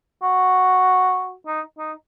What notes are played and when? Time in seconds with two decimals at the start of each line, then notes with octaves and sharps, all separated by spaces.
0.22 F#4
1.47 D#4
1.78 D#4